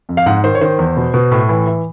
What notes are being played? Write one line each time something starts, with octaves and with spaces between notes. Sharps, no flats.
F2
F5
G#2 F#5
D#3 C5
C#5
D#3 C5
E2
B2
B2
A2
E3
E3